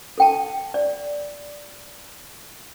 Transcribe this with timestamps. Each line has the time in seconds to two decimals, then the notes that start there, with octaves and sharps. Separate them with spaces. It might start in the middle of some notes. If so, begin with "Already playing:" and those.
0.18 A4 G5 A5
0.74 D5